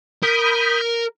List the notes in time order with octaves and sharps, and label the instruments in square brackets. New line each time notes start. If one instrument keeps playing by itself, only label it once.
[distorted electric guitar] A#4 [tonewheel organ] B5 D#6 G6